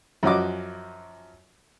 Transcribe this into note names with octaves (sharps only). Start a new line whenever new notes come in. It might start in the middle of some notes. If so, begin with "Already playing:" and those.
F#2 F3 C#4 F#4 D#5 D6